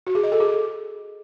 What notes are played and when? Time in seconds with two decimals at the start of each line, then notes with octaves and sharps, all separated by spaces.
0.07 F#4
0.15 G#4
0.23 D#5
0.32 A4
0.40 G#4